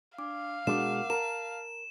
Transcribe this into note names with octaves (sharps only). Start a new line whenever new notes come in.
D4 F5 D6
B2 G#3 D4 A#4 F#5 D6 E7
A#4 A5 A#5 E7